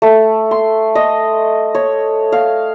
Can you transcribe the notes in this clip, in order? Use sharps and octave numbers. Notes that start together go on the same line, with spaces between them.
A3
C6
D#5
C#5
F5